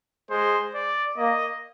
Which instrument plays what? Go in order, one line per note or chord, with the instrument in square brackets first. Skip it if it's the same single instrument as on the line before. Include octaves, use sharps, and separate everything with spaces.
[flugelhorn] G#3 [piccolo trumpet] C5
[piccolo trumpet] D5
[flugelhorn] A#3 [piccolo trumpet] D#5